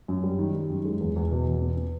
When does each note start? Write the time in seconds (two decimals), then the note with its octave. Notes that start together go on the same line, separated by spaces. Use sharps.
0.08 F#2
0.24 G3
0.39 D#3
0.54 G3
0.70 F#2
0.85 G#3
1.00 E2
1.16 E2
1.31 B2
1.46 E2
1.62 B3
1.77 B3